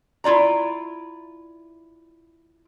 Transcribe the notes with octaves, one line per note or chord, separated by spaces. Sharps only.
E4 F4 D5 A#5